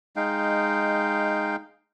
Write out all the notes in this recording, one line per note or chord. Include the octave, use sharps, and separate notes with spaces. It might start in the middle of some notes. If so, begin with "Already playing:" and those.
G#3 D#4 F5 G5